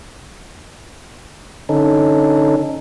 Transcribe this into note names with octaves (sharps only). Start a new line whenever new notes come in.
D3 C#4 D#4 A4